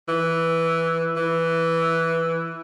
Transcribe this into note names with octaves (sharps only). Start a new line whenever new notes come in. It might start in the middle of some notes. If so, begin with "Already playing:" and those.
E3
E3